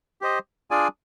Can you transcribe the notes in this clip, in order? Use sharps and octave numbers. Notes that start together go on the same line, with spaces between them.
G4 C5 D#5
D4 F4 G#4 D5 G#5